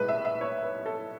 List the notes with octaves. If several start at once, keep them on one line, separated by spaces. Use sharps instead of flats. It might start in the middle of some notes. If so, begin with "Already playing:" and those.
Already playing: B1 A2 G#3 B4
E5
E5
C#5
B4
A4